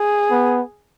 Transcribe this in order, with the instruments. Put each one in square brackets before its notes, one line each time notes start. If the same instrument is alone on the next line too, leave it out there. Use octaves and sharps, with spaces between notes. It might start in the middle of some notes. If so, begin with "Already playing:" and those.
Already playing: [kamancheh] G#4
[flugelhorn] B3